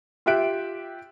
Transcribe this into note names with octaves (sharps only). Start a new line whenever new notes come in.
F4 G4 E5 F#6 D7